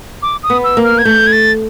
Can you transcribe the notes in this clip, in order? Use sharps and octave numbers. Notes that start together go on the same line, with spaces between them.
D6
D#6
B3
E6
A#3
F6
G#6
A3 G6
G#6
A6